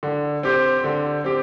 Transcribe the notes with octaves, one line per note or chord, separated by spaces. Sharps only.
D3
C4 G4 C5
D3
C4 G4